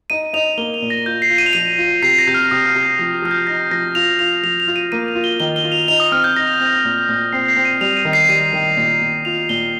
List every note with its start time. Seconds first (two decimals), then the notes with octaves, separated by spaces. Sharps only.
0.10 D#4 D#7
0.33 D#4 F7
0.58 A#3 G7
0.74 F7
0.82 A#2
0.90 A#6
1.06 F4 G6
1.22 C7
1.30 F4
1.38 D#7
1.46 F7
1.53 F3 D#7
1.78 F4
2.02 C3 C7
2.18 A#6
2.27 C3 G6
2.34 F6
2.51 C3 D#6
2.67 F6
2.75 C3
2.83 G6
2.99 F3
3.22 F3 F6
3.31 G6
3.47 D#4 A#6
3.71 F3 A#6
3.95 F4 F7
4.19 F4 F7
4.43 F3 F7
4.60 F7
4.68 F4
4.76 D#7
4.92 A#3 D#7
5.08 F7
5.15 F4
5.24 G7
5.40 D#3 G7
5.56 G7
5.64 F4
5.72 F7
5.88 D#4 F7
6.00 D#6
6.12 C4 F6
6.24 G6
6.36 D#4 A#6
6.60 C4
6.85 A#2
7.09 A#2
7.33 C4 C7
7.48 C7
7.57 C4
7.65 D#7
7.81 G3 F7
7.97 D#7
8.05 D#3
8.13 C7
8.29 G3 D#7
8.53 D#3
8.77 A#2
9.01 A#2
9.25 F4 F7
9.49 A#2 G7